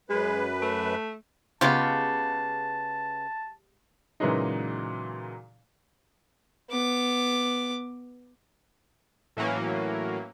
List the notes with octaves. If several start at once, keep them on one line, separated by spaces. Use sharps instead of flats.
F#2 G#3 B4
A3
C#3 G#3 B3 F4 G4 A5
A#2 C#3 E3 F#3 G#3 D#4
B3 D6
A2 E3 F#3 A#3 C#4